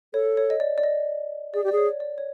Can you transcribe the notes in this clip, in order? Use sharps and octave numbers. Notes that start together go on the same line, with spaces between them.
A4 C#5
C#5
D#5
D5
D5
D#5
G#4 D5
G4 D5
G#4
C#5
D5
C#5